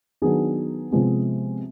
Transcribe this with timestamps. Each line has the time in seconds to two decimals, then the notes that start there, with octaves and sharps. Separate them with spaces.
0.22 D#3 F#3 B3 D4 G#4
0.91 C3 F3 G#3 B3